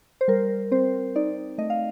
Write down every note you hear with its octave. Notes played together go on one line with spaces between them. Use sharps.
C5
G3 A#4
C4 C5
D#4 D5
A3 D#5
F5